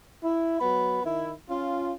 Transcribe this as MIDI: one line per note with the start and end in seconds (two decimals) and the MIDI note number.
0.24 0.60 64
0.61 1.02 54
0.61 1.02 59
0.61 1.02 83
1.04 1.32 51
1.04 1.32 64
1.50 1.93 61
1.50 1.93 65